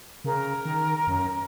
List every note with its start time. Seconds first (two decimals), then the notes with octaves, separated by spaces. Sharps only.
0.24 C#3 A#4
0.65 D#3
1.07 F#2